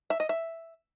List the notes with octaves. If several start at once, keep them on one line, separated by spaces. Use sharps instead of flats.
E5
D#5
E5